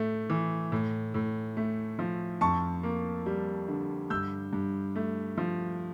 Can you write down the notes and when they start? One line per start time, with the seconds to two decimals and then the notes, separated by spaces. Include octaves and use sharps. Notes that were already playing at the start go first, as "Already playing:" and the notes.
Already playing: A2 A3
0.30 E3
0.72 A2
1.14 A2
1.57 A3
1.99 F3
2.41 F2 A5 C#6
2.83 A#3
3.26 G3
3.68 D3
4.10 G2 E6 G6
4.53 G2
4.96 A3
5.38 F3